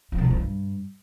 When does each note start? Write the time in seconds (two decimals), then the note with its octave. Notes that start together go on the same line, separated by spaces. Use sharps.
0.12 F3
0.18 C3
0.24 G#2
0.31 F3
0.37 G2